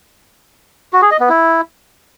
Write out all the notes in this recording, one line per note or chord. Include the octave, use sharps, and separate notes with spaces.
F#4
G#4
D#5
B3
E4